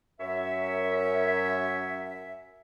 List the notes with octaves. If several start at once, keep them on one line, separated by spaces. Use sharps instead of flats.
F#2 C#5 E5